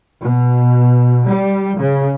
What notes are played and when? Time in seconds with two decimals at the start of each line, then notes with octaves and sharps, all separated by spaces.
0.23 B2
1.29 G3
1.79 C#3